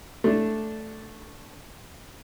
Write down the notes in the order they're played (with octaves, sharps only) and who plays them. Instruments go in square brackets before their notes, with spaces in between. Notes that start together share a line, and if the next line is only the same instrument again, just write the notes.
[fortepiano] A3 D4